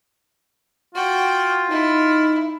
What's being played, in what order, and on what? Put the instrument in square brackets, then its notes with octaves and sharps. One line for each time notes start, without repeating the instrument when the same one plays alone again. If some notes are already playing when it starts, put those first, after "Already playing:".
[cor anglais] F4 [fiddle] F#4 G5
[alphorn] D#4 [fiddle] E4